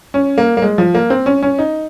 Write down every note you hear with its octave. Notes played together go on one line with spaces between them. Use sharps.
C#4
A#3
A#3
G#3
F3
A#3
C4
C#4
C#4
D#4